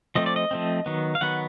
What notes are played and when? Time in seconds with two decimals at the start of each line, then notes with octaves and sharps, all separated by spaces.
0.15 F3 A3 C4 D#5
0.26 D5
0.36 D#5
0.51 F3 A3 C4
0.86 D#3 F#3 B3
1.15 F5
1.21 D#3 F#3 B3 F#5